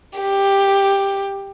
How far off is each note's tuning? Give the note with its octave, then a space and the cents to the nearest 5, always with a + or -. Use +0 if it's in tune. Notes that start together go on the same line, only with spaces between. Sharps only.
G4 +10